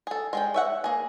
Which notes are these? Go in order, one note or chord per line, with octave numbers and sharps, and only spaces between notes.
G#4 A4
G#3 G#4 G5
C#5 E5 F#5
A#3 G#4